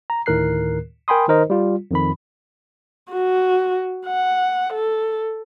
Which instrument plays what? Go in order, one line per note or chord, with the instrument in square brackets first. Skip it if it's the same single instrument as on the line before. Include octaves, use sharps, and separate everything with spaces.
[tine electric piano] A#5
D2 A2 D#3 A#4 F#6 C7
A#4 G5 G#5 B5 C6 D#6
D#3 D#4 A#4 C5 D#5
G3 F4
F2 D#3 B5
[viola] F#4
F#5
A4